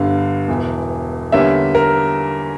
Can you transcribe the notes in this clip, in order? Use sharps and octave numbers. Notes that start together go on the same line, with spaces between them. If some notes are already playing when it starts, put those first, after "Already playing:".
Already playing: G1 G2 D3 F5
E1 E2 E3
E2 D3 G3 A#3 C#4 E5
A#4